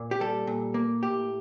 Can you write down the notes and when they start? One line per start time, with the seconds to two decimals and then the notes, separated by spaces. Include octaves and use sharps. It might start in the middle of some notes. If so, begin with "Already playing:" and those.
Already playing: A#2 A#3
0.11 G4
0.20 G3 A4
0.47 A#2
0.74 A#3
1.02 A2 G4